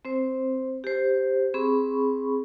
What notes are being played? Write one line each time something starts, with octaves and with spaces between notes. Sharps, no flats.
C4 C5
G4 C5
C4 G#4 B5 C#6